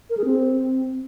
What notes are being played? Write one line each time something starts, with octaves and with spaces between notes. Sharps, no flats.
A#4
G#4
C4